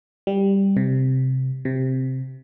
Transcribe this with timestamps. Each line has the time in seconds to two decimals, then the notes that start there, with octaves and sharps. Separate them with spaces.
0.27 G3
0.77 C3
1.65 C3